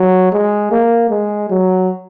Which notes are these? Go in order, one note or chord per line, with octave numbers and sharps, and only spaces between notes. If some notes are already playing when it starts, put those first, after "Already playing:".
Already playing: F#3
G#3
A#3
G#3
F#3